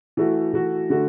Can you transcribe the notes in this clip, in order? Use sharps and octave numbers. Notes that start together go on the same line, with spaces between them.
E3 A3 F#4
E3 A3 F#4
D3 A3 F#4